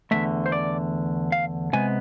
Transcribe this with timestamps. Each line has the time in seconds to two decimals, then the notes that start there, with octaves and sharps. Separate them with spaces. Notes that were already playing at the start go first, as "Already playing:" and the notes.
0.11 E2 D3 F3 A3 E5
0.46 C5
0.52 D5
1.32 F5
1.73 C3 G#3 B3 G#5